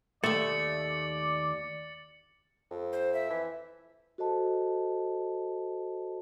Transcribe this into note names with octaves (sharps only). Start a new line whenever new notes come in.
D#2 A3 D5 A6 C#7 F#7
F2
C5
E5
E3
F#4 A4 C5 D#5 A5